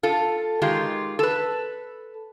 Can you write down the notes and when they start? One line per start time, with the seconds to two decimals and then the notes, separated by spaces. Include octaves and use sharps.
0.03 F4 A4
0.62 D#3 G#3 F4 G4
1.19 A4 B4